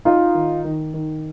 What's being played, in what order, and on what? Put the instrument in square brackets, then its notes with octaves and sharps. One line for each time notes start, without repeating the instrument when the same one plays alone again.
[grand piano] D#4 [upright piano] F4
[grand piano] D#3
D#3
D#3